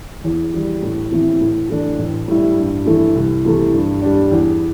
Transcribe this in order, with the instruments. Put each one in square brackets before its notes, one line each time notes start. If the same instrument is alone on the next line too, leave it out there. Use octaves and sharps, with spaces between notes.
[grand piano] E2
E3 G3
A2
E3 C4 E4
A2
E3 A3 D4
A1
A2 G3 E4
G2
E3 A3 E4
C2
C3 E3 A3
G2
G3 D4
E2